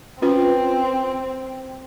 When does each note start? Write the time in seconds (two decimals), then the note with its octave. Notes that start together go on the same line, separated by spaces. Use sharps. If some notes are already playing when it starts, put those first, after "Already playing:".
0.22 C4 C#4 F4 B4